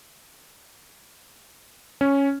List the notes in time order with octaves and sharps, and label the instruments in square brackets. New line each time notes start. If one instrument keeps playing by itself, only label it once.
[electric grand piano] C#4